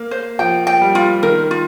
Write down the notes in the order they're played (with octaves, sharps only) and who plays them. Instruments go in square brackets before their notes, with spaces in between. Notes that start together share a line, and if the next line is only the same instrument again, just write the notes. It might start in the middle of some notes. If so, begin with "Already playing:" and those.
Already playing: [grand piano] A#3
[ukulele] C5
[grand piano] F3 [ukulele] G5
[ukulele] G5
[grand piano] G3
[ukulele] F4
[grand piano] D#3 [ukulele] A#4
[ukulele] F4